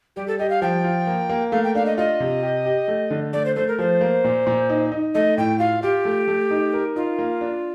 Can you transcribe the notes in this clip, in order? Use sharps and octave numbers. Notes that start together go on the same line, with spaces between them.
G3 G4
A4
G4 D#5
F5
F3 G5
F4
A#3
A#3
A3 F5
G5
D4 F5
D#5
F4 D#5
C3
G4
G4
A3
D3
A3 D5
C5
A3 C5
A#4
F3 C5
A#3
A#2
A#2
D#4
D#4
A3 D#5
A2 G5
F4 F5
F4 G4
A3
A3
D#4
A#4
D#4 F4
A#3
D4